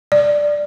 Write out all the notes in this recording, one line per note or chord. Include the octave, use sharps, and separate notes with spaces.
D5